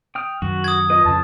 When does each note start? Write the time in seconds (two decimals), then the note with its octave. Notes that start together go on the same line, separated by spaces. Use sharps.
0.15 G5 D#6 F6
0.42 F#2 D#3 F#4
0.64 D#6 G#6
0.90 F4 B4 D#5
1.05 F2 C#3 A5